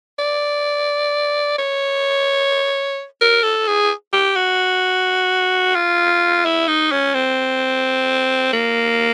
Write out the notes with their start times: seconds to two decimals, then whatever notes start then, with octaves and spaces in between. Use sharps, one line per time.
0.19 D5
1.58 C#5
3.21 A#4
3.43 A4
3.67 G#4
4.13 G4
4.36 F#4
5.75 F4
6.45 E4
6.68 D#4
6.91 C#4
7.14 C4
8.53 A#3